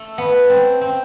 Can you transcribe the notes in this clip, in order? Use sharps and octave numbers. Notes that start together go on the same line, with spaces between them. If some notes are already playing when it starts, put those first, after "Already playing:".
Already playing: A3
B3
C4
C4